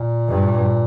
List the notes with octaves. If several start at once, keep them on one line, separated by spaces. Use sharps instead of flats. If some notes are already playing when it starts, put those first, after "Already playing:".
Already playing: A#2
G2